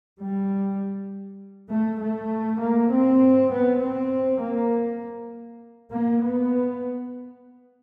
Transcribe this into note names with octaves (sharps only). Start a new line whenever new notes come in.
G3
A3
A3
A#3
C4
B3
C4
A#3
A#3
B3